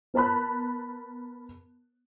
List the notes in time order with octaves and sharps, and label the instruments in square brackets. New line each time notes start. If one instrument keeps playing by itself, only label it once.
[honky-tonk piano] B3 A#4 A5 B5 F#6